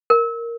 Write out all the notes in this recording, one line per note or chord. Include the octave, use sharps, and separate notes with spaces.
A#4